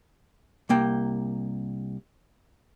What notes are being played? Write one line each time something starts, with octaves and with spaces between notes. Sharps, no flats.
C2 A#3 G5